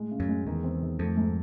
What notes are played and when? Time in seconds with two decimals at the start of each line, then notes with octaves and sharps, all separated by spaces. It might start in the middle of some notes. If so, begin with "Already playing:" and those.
Already playing: A2 G#3
0.11 C#3
0.20 F#2
0.29 G#3
0.46 E2 D#3
0.64 C4
0.82 D#3
0.99 F2 A3
1.17 G#2